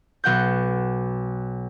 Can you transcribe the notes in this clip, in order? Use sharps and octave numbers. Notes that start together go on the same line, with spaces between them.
B1 F#5 G6